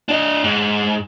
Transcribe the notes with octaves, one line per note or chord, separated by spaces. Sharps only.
D4 D#5
G#2